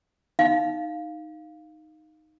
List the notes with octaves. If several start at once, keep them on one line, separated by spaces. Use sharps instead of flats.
D#4 F5